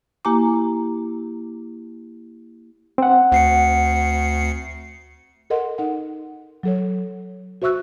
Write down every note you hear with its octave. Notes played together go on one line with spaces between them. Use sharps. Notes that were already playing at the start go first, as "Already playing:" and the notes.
A#3 E4 G4 G#5 A#5 D6
C4 F#5
D2 C7 C#7
A4 A#4 D#5 F#5 C6
D#4 F#5
F#3 A4 C#5
F#4 C5 E5 C#6 E6 F#6